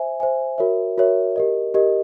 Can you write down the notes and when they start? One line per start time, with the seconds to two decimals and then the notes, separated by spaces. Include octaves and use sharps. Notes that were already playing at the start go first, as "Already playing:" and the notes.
Already playing: C5 E5 G#5
0.20 C5 E5 G#5
0.58 F#4 A#4 C#5 E5
0.98 F#4 A#4 C#5 E5
1.36 G4 A#4 D#5
1.74 G4 A#4 D#5